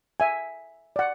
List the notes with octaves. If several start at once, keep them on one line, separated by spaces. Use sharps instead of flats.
E5 G#5
D5 F#5